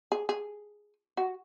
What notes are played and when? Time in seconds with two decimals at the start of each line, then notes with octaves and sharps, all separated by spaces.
0.12 G#4
0.29 G#4
1.17 F#4